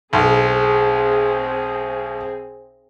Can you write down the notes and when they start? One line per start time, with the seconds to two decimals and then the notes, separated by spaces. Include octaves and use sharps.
0.13 B1 C4 G#4